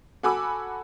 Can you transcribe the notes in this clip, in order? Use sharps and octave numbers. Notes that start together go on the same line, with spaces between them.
F#4 A4 G#5 B5 D6 E6